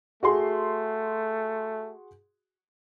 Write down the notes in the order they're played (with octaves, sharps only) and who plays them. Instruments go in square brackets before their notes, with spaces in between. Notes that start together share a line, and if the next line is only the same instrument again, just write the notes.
[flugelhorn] A3 [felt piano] F#4 G#4 C6